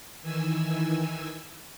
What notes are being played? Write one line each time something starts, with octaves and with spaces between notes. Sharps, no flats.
D#3 E3 G#5 E6